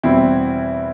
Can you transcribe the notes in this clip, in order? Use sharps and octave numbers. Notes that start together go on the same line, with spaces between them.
E2 B2 G3 C4 E4